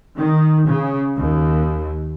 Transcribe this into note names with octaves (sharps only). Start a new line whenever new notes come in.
D#3
C#3
D#2